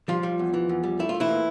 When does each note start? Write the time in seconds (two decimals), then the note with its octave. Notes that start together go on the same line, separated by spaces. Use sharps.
0.08 F3 G3 F4
0.23 G3
0.39 E2
0.54 E3
0.69 E2
0.83 G3
0.99 A3 E4
1.09 F4
1.14 A3
1.20 E3 E4
1.28 A#2